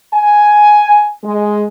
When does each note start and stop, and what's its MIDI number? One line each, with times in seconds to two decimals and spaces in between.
0.14 1.11 80
1.24 1.65 56